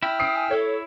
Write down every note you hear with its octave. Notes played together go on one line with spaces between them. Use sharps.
E4 G5 F6
D#6 C7 D7
G#5
A4 C#5